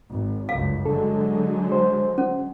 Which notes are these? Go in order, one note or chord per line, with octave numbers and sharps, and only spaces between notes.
G#1
G1 C#2 F#2 F5
D3 F#3 G#3 A4
C5
C#4